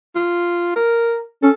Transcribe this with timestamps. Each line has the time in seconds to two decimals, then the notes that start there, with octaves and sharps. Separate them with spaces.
0.16 F4
0.76 A#4
1.43 C#4 A4